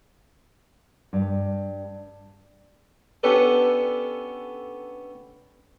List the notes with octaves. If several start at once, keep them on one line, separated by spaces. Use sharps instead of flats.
G2
B3 C#4 D4 G4 A4 B4